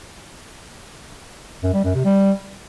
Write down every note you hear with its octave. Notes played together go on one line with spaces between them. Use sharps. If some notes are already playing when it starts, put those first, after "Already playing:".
F#2
G3
F#2
C3
G3